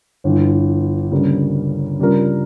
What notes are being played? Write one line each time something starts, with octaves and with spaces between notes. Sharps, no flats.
G1 G2 E3
D2 C#3 G3 A#3
C#3 G3 D4 F4 A#4